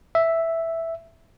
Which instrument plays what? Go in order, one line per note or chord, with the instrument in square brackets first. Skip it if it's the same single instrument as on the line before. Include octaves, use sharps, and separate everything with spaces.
[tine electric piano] E5